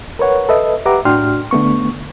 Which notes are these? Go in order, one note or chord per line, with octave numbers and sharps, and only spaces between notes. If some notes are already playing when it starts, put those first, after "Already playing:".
A#4 B4 C#5 F#5
A4 B4 D#5 E5
G4 B4 E5 F#5 A#5 D6
A2 D4 F#4 G5 C6 F6
D3 A3 B3 C#6